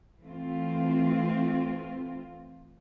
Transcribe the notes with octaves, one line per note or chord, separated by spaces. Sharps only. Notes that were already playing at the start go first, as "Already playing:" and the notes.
E3 A3 C4 F4